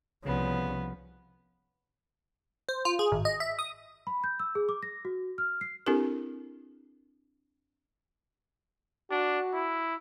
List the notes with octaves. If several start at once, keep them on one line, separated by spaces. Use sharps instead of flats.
C2 C#3 F3 B3
C5
F4
G#4
G#1
D#5
E5
D#6
B5
G6
E6
G#4
D6
A#6
F#4
F6
C7
C4 D4 E4 G4 A4 A#4
D4 F#4
E4